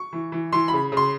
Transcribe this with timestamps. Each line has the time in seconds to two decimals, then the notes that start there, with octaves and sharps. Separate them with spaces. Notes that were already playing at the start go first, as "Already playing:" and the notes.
Already playing: C#6
0.13 E3
0.32 E3
0.52 E3 C6
0.68 B5
0.73 C#3
0.92 C#3
0.97 C6